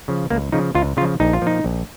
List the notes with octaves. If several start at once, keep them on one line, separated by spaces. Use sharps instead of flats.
C#3 F3
C#2 A#3
C#3 F3 D#4
C#2 F4
C#3 F3 F4
A#1 D#4
F4
A#2 F3 D#4
A#1